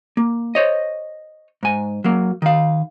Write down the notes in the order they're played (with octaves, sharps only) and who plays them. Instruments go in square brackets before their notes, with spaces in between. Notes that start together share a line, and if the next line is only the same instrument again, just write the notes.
[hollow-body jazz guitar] A#3
C5 C#5 D#5
G#2 G#5
F#3 A#3
D#3 F5